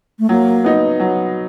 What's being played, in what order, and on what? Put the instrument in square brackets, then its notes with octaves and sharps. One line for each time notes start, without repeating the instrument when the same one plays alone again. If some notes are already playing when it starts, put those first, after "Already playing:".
[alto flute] A3
[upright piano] F#3 [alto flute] A#3
[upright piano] B3 D#4
F#3